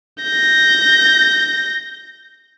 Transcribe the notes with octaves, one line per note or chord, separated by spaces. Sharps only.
G6 A#6